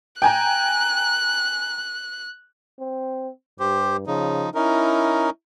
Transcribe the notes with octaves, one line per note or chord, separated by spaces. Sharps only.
G5 G#5 A#5 F#6
C4
G2 G4 C5
C#3 F3 D#4
C#4 D#4 E4 A#4